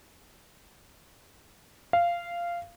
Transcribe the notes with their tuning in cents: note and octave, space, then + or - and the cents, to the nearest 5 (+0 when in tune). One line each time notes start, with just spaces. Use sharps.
F5 -15